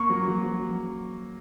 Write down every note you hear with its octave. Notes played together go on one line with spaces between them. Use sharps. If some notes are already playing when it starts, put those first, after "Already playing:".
Already playing: A#3 C#6
F#3
F#3
F#3